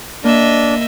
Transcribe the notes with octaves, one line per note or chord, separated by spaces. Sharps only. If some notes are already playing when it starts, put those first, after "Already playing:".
A#3 D4 D#5 E5